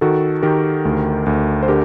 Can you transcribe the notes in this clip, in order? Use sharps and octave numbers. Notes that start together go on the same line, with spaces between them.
D#3 F#4 A4
D#3 G4 A#4
D2
D2
C5
D3 G4 A#4